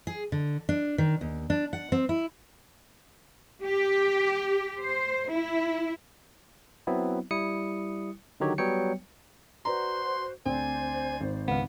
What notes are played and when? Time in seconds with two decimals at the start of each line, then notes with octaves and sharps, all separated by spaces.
0.07 G#4
0.32 D3
0.69 D4
0.98 D#3
1.21 D#2
1.50 D4
1.73 F#5
1.92 C4
2.09 E4
3.64 G4
4.82 C5
5.30 E4
6.87 F#3 B3 C4 E4
7.31 G3 E4 D#6 C#7
8.40 D3 D#3 F#3 D#4 G4 C#5
8.58 F#3 G3 B3 C#5 G5 C#7
9.65 F#4 B4 C5 D5 A#5 C6
10.46 D2 C4 C5 D5 G#5
11.21 G#1
11.48 C#2 B3 F5